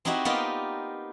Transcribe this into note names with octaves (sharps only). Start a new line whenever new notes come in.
C4 D#4 E4 F#4 G4 C5
A#3 B3 D#4 F4 G4 D5